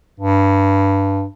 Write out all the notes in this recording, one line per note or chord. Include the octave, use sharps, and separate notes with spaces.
G2